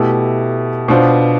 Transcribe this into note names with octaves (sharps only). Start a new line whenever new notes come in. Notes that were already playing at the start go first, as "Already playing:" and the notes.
Already playing: B2 A3 E4 G4
B2 B3 D4 F4 C5